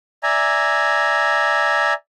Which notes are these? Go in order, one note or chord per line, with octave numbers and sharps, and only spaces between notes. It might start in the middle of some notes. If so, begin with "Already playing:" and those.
D5 E5 G#5 A#5